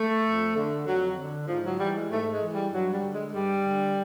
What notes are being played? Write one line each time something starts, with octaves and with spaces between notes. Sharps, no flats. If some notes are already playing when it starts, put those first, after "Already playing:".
Already playing: A3
F2
D3
F2 F#3
D3
G#2 F3
F#3
E3 G3
G#3
G#2 A3
G#3
E3
G3
G2 F#3
G3
D3
G#3
G2 G3
D3